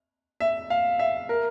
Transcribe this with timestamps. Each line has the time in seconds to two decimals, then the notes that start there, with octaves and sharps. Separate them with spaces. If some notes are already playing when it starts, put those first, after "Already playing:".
0.40 E5
0.70 F5
0.99 E5
1.29 A#4